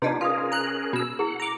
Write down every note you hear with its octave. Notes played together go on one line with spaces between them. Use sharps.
C3 B3 D4 D#4 F4 G4 B4 D5
C#4 F4 G#4 A#4 F5 D#6
A#5 F#6
B2 E6
E4 G#4 F#5
A#5 D6